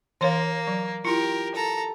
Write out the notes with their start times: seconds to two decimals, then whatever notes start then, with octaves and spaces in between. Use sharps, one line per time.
0.21 E3 A#3 C#5 F5
0.67 F#3
1.05 E4 F4 G4 A#4
1.55 A4 A#5